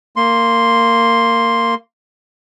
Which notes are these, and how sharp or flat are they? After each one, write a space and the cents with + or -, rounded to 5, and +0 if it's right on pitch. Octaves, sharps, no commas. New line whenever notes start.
A#3 -20 C6 +0